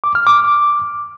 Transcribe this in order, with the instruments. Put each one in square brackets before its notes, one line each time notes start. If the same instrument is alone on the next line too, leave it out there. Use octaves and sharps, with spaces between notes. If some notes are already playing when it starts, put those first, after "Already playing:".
[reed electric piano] D6
F6
D6